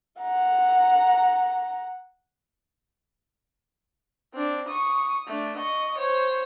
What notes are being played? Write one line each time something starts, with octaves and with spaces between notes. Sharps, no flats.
F#5 A#5
C4 D4
C#6 D#6
A3 D4
D#5 C#6
C5 C#5